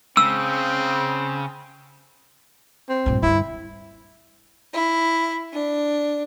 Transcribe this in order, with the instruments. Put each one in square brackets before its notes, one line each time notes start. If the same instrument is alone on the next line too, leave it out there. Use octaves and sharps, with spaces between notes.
[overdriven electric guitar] C#3 [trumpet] C4 [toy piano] E6
[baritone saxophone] C4
[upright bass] G2 A#2
[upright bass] G2 D3 [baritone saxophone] E4
[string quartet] E4
D4